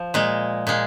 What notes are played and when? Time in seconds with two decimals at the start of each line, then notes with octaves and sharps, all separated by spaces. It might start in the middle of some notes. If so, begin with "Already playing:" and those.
Already playing: F3
0.14 A#2 G#3
0.67 A#2 G#3